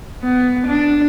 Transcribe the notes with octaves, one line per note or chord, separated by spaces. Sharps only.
B3
D4